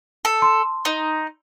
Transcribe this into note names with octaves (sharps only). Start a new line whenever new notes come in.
A4
C6
D#4